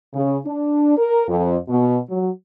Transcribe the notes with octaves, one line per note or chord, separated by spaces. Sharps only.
C#3
D4
A#4
F2
B2
F#3